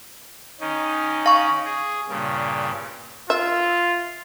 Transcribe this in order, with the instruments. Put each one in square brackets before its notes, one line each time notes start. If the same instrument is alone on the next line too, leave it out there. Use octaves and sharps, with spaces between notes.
[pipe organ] D#3 C#4 D#4
[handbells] F5 C#6
[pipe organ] G#4
G2 A#2 C#3
[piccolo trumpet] F4 [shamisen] E5